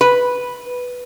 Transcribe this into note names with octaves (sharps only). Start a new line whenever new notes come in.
B4